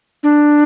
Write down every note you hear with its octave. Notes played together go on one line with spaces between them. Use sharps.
D4